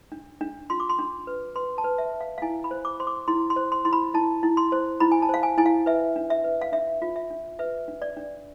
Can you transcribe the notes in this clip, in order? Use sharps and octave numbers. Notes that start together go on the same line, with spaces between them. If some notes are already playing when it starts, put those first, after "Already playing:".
D4
D4
F4 C6
D6
C6
D4
B4
B4 C6
A5
B4
E5
B4
F5
F5
E4 G#5
B5
C5
D6
C5 C6
D6
E4 C6
C6
C5
C6
E4 C6
B5
E4 A5
E4
C6
C5
E4 B5
G#5
A5
C5 F5
G#5
E4 G#5
F5
B4 E5
D4
E5
B4
F5
D4 E5
F4
E5
D4
B4 E5
D4
D5
D4